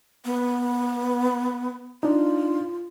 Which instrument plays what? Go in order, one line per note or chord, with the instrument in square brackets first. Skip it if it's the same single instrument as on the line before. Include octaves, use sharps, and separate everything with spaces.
[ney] B3
[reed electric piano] D4 D#4 [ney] F4